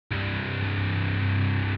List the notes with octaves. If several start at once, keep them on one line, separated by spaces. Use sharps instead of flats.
C2 G2